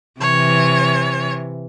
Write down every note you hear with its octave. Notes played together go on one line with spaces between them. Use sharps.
C3 E3 C#5